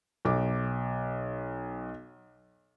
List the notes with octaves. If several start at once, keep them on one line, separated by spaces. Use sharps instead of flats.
B1 D6